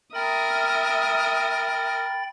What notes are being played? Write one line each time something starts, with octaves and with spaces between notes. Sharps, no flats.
A#4 E5 G5 B5 D#6 A6